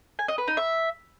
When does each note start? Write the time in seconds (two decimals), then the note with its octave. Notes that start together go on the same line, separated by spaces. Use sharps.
0.19 G#5
0.28 D#5
0.38 B4
0.48 D#4
0.57 E5